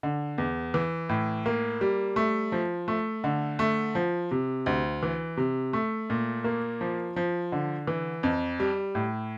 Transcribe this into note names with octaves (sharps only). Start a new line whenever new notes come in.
D3
E2
E3
A2
A#3
G3
A3
F3
A3
D3
A3
F3
C3
D2
E3
C3
A3
A#2
A#3
F3
F3
D3
E3
F2
G3
A2